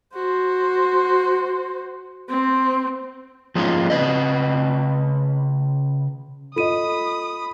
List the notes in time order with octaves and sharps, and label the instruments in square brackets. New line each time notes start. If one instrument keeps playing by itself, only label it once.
[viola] F#4 C5
C4
[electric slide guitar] F3 G#3 A#3 C#4 F4
C#3 B4 D#5
[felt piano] F4 D#5 [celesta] A4 D#7 [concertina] B5 [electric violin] D#6